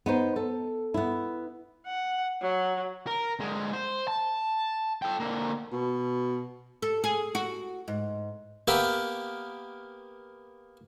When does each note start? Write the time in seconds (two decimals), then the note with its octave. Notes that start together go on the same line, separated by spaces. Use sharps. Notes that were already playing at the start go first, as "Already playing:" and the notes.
0.06 B3 D#4 C5
0.36 A4
0.94 B3 E4
1.87 F#5
2.42 F#3
3.07 A#4
3.40 D3 G#3
3.73 C5
4.08 A5
5.02 A4 G5
5.20 D3 A#3
5.72 B2
6.82 A4
7.04 G#4
7.35 F#4
7.88 G#2
8.68 A#3 B3 G4 A#4 E5